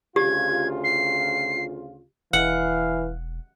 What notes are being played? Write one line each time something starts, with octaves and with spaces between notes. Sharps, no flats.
D2 C#3 F4 G4 G#6
C7
E1 E3 F5 F#5